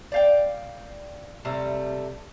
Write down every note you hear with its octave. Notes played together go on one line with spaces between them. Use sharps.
D5 F5 G5
C3 G3 A3